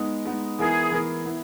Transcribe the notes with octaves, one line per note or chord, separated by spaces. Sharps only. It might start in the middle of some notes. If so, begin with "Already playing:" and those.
Already playing: G#3 B3 D#4
G#3 B3 D#4
E3 B3 E4 G#4 A#4
E3 B3 E4 A#4
B3 E4